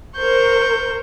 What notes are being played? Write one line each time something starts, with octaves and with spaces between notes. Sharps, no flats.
A#4 C5 C#6 G6